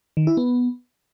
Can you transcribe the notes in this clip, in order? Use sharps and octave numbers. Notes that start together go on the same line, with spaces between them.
D#3
E4
B3